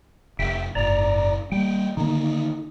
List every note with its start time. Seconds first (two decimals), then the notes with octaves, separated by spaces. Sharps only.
0.39 F1 E5 G5
0.75 F#1 G#2 D5 A#5
1.52 G3 A#3 G5
1.97 D3 D#3 A#3 D#4